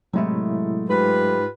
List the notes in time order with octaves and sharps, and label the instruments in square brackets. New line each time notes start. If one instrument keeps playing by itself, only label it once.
[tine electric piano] A2 C3 E4 [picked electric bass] F#3 G#3 A3
[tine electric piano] G#2 [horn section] F4 G4 B4